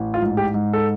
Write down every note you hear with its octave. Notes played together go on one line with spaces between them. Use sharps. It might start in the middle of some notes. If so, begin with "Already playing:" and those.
Already playing: A1
F4
G#2
G4
G#2
A4